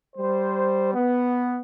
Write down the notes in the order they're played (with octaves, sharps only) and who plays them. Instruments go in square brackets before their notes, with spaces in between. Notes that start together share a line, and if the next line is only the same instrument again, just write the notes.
[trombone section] G3 C5
B3